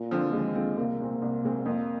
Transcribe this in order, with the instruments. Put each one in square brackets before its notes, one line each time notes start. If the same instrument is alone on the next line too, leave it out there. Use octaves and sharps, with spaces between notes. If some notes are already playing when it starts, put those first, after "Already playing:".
Already playing: [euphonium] A#2
[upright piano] D3 F3 C4 F4
[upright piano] D#2 [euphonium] G#3
[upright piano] D3 F3 C4 F4
[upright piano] C2 [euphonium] A#3
[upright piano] A#2 G#3 C4
C2
A#2 G#3 C4
[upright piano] F2 [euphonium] A#3